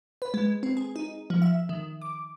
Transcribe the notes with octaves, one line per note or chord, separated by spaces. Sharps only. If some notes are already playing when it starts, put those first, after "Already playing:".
B4
G#3
C4
G#4
D#4
F3
E5
D#3
D6